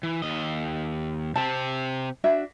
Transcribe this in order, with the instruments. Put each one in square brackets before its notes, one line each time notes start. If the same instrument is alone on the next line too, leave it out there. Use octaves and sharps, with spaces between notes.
[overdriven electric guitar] E3
D#2 D#5
[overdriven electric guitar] C3 C4 [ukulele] A5
[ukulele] D4 F#4 E5